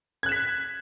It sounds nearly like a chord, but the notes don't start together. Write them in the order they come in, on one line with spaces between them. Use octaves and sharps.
G#6 F#6 E7 B6